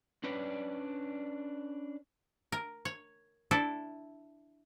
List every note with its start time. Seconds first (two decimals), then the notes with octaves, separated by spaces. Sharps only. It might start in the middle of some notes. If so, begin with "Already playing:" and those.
0.24 C#4 D4 B4 D5
2.52 A#4
2.85 C#5
3.51 D4 E4 A4